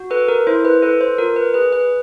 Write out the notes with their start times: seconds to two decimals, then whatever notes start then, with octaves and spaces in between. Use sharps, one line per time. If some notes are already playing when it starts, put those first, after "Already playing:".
Already playing: F#4
0.10 A4 B4
0.28 A#4
0.47 E4 C5
0.65 B4
0.82 A4 B4
1.01 C5
1.18 F4 A#4
1.36 B4
1.54 G#4 B4
1.73 B4